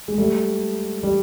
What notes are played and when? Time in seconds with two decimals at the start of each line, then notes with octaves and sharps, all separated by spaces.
0.08 G#3
0.18 G3 A3
1.03 G3